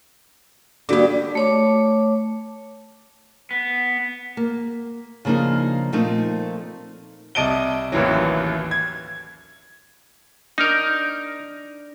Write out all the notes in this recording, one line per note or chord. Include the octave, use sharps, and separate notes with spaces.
D3 G3 A#3 F#4 D6
A3 C#5 D6
B3
A#3
C#3 F3 A#3 D4 D#4
A#2 F3 A3 A#3 C4 D#4
C2 D#5 A5 D7 D#7 G7
A1 D#2 E3 F#3
G#6
D4 D#4 A#4 F6 G6